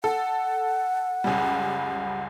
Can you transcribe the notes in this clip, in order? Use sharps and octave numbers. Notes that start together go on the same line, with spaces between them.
A4 F#5
C#2 F#2 G3